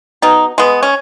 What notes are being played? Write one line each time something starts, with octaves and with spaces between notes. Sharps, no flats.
B2 D#4
G#3 B3
C#4